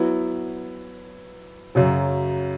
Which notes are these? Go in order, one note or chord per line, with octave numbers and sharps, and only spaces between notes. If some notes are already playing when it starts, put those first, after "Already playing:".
Already playing: F#3 B3 E4
F#2 C#3 F#3